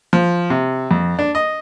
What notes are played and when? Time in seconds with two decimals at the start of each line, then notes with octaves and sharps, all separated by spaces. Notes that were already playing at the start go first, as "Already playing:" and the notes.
0.13 F3
0.50 C3
0.91 F2
1.19 D4
1.35 D#5